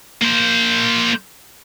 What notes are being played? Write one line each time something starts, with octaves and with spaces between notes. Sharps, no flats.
A#3 C5